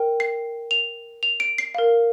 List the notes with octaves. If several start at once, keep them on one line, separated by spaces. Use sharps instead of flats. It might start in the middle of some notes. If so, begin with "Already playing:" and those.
Already playing: A#4 G5
C7
F7
F7
D7
C7
A#4 F5